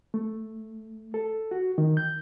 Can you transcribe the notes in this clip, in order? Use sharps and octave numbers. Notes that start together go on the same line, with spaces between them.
A3
A4
F#4
D#3
G6